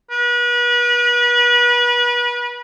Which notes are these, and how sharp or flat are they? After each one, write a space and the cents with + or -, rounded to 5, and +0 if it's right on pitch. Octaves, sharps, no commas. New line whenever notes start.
B4 -35